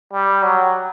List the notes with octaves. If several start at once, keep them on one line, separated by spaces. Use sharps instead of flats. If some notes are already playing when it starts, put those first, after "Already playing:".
G3
F#3